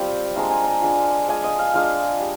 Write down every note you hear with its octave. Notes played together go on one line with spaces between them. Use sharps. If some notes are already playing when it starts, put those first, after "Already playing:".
Already playing: G3 C4 F4 G5
G#3 D4 F4 A#5
G#5
A#5
G#3 D4 F4
G#3 D4 F4 G#5
D#5
F5
G#3 D4 F4 F5
G3